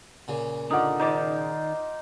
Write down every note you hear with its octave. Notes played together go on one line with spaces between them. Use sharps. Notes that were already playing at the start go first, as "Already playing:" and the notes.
A#2 C#3
D3 D#4 F4 D5 F#5 D#6
D#3 D#4 C5 D5 D6